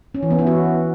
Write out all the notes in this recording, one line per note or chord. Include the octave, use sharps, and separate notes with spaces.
C#4
E3
B3
E4
F#4